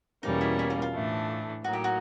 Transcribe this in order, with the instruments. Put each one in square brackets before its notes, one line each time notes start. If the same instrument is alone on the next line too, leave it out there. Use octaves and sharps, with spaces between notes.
[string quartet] E2 B2 G3 A#3 C#4 [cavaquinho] D#4
[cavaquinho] E4
E4
F4
F4
[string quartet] A2 E3 A3 D4
[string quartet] A2 F#3 A#3 D#4 [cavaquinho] F#4
[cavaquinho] G4
F#4